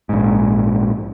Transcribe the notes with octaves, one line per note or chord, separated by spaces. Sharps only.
A#1 G#2